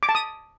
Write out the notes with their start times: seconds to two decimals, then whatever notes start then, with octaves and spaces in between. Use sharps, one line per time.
0.03 D6
0.09 A5
0.15 D#6